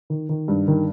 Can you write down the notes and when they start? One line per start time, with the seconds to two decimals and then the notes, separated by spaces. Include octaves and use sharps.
0.10 D#3
0.29 D#3
0.48 G2
0.68 D#3